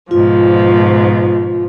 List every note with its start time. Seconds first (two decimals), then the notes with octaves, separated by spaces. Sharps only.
0.11 G#2 B2 F3 F4